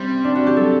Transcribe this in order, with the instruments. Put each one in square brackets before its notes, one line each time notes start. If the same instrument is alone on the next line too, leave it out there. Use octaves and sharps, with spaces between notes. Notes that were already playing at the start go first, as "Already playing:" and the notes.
Already playing: [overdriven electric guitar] G3 [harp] C4
[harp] D4
F#4
G4
[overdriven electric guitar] F#3 [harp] A4